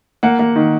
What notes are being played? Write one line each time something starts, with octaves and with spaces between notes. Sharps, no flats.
A#3 F#5
A#3
D#3